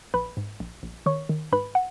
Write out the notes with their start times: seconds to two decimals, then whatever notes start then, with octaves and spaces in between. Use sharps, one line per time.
0.14 A#1 B4 B5
0.37 G#2
0.60 A#1
0.83 A#1
1.06 D#3 C#5 C#6
1.29 D#3
1.52 G#2 B4 B5
1.75 F#5